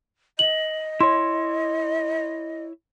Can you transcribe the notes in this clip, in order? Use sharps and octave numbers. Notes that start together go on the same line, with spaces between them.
D#5 F#7
E4 C#5 C6